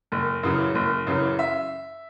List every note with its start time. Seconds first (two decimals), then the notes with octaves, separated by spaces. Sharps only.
0.12 F#1
0.43 F#2 C#3 E3
0.75 F#1
1.07 F#2 C#3 E3
1.39 E5